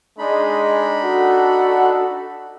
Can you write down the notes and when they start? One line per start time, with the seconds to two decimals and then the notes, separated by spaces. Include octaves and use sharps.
0.18 G#3 D4 D#4 B5
1.03 F#4 A4 F#5